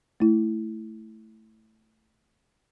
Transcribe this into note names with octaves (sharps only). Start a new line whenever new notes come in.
A3 E4